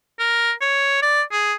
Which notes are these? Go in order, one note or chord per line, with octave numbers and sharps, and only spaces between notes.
A#4
C#5
D5
G#4